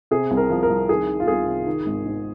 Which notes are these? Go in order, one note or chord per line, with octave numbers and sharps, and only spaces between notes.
C3 G#4
C2
A#4
F3
A#4
C2
D#3 G#4
D#3
F4
C2 G#4
C3
D#3
G#1
G#2